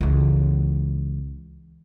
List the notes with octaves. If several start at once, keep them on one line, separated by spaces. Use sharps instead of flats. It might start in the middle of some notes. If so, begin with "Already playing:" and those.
C#2 E3